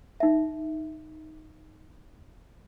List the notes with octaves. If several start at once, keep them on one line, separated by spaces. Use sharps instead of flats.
D#4 E5